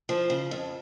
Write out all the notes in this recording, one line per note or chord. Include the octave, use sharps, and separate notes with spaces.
F3
C#3
F2